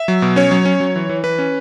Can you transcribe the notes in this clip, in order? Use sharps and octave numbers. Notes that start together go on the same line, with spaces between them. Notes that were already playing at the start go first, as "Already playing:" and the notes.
Already playing: E5
F#3
B2
C#4 C#5
F#3
C#4
F#3
E3
E3
E3 B4
C#4